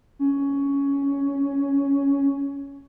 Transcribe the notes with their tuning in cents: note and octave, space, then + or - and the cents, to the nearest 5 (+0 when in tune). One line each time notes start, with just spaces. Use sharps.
C#4 +10